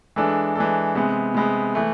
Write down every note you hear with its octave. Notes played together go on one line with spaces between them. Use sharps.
E3 G#3 D4 A4
E3 G#3 D4 A4
C3 G#3 B3
C3 G#3 B3
E3 A3